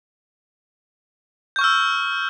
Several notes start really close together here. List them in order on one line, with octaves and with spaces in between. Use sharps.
G6 C#6 F6 E6